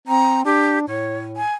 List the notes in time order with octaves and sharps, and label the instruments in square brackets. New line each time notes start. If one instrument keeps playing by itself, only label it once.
[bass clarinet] C4 [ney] A#5
[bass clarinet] D4 [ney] G4
[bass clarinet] A2 [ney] C#5
[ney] G#5